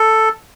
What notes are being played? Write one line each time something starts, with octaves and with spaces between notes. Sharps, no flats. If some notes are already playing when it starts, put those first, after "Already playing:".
Already playing: A4